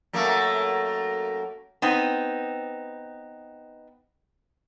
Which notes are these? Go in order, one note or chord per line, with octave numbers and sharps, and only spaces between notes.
F#2 A3 A#3
B3 C4 D#4